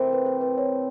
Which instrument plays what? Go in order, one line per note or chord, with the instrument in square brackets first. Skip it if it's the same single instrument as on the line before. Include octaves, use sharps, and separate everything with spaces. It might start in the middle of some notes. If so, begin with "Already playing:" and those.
Already playing: [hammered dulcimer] C3 E3 A3 C4 [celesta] A#4
[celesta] B4
C5
B4
C#5